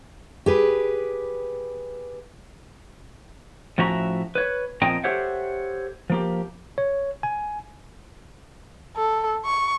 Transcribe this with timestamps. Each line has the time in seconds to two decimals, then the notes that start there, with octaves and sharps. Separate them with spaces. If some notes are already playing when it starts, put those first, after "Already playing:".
0.46 G4 G#4 B4
3.78 A2 F3 C#4 F#4 E5 A#5
4.35 B4 C#5
4.82 A#2 F3 C4 D#5 G5 A#5
5.04 G4 A4 C5 C#5 E5 F#5
6.10 F3 A#3 G4
6.78 C#5
7.23 G#5
8.96 A4
9.45 C#6